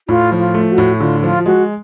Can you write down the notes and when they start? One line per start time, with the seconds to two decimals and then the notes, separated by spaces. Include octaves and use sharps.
0.08 A2 F4
0.32 F3
0.39 F4
0.54 A3
0.70 F#4
0.78 A2
1.00 D3 F4
1.22 F3 F4
1.46 G#3 F#4